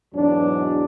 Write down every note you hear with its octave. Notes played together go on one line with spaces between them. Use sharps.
E2 G#2 B2 F#3 D4